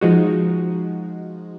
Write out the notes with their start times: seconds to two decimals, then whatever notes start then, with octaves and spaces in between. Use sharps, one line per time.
0.01 F3 G#3 D#4 F#4